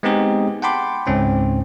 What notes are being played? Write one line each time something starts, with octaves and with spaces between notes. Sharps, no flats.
G#3 B3 C4 D#4 G4 G#4
F#5 G5 A5 B5 C6 D6
C#2 G#2 C4 C#4